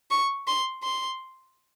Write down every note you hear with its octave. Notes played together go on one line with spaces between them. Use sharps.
C#6
C6
C6